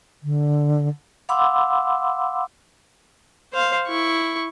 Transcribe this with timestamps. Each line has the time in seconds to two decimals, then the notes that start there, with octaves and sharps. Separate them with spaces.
0.23 D3
1.29 F5 F#5 B5 C6 D6 E6
3.53 C5 F5
3.87 E4 C#6